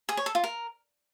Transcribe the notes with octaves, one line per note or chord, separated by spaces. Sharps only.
G#4
C#5
A4
F4
A#4